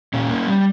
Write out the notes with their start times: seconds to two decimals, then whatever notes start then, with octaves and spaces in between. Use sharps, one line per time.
0.14 A#2 C#4
0.30 A#3
0.47 G3